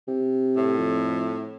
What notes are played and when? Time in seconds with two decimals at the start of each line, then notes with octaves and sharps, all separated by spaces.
0.08 C3
0.56 A2
0.78 F2